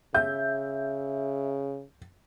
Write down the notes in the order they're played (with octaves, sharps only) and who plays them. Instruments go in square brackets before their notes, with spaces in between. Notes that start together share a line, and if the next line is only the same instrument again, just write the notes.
[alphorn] C#3 [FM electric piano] E5 [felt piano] G6